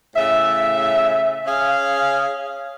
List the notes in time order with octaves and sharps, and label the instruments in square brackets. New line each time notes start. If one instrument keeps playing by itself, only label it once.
[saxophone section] A2 C#3 E5
C#4 G#4 F5